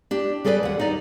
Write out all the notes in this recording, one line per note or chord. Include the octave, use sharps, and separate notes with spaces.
D4 G4
G3 G#4 A4 B4 C5 D5
D#2 F#5
D#4 D5